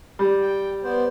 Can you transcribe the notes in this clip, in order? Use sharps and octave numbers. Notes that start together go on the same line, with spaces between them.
G3
G5
B3 C5 D5